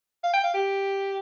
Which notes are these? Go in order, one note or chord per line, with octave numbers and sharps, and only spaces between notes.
F5
G5
F5
G4